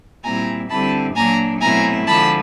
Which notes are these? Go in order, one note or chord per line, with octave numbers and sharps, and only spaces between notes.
A#2 G3 C4 E4 G#5 A#5
D3 G3 C4 E4 A5 B5
A#2 F#3 A#3 D4 G#5 A#5
B2 F#3 A3 C4 E4 G#5 A#5
D3 F3 G#3 A5 B5